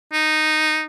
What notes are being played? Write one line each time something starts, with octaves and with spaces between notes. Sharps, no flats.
D#4